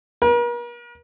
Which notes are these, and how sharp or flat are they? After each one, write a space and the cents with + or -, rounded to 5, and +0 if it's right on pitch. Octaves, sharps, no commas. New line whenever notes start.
A#4 +45